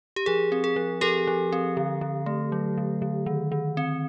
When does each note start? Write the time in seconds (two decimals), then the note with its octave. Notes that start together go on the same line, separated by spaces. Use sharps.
0.16 G4
0.26 F3 G#4
0.52 C4
0.64 G#4
0.76 F3
1.01 F3 G4 A4
1.28 F3
1.53 C4
1.77 D3
2.01 D3
2.26 A3
2.52 F#3
2.78 D3
3.02 D3
3.26 D#3
3.52 D#3
3.77 C4